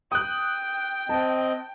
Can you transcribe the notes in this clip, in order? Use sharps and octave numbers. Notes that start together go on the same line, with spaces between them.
G5 D#6 F#6
C4 D#5 A5